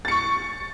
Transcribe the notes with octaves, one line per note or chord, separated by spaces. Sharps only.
C#6 A6 C#7